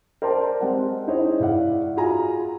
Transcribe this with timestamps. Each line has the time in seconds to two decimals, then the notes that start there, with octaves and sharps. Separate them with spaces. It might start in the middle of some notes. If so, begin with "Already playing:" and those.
0.22 A#4 C5 D5 G5 A5 C6
0.61 G#3 C4 G4 F#5
1.07 D#4 E4 G#4 C5 C#5 D#5
1.40 G#2 E4 D5 F5 F#5
1.97 F4 F#4 G#4 G#5 A#5